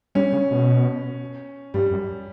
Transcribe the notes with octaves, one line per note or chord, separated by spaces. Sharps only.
G3 C#4
C#3
B2
G2 G3
F#2